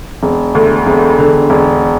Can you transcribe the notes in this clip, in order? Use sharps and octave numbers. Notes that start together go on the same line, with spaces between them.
E1
D2
E1
D3
E1